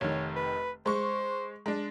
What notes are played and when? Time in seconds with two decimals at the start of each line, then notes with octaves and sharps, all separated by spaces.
0.01 F1 D#3 C#5
0.36 B4
0.86 G#3 C5 C#6
1.66 G#3 D4